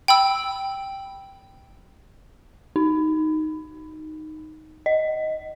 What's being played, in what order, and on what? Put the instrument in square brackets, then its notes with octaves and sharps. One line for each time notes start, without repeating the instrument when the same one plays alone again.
[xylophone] G5 B5 E6
[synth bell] D#4
D#5